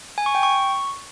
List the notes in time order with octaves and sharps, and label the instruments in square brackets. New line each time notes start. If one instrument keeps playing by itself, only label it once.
[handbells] G#5
C#6
G5
C#6